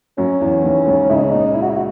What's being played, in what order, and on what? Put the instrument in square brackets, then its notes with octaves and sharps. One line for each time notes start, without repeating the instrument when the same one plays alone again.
[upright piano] F#2 F#3 [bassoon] C#4
[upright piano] E2 E3
D#2 D#3
C#2 C#3
[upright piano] C#2 C#3 [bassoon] E4
[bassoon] D#4
C#4
[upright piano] A#2 [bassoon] D#4
[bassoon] E4
F#4
E4
F#4